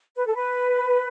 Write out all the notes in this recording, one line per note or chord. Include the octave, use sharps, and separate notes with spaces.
B4
A4
B4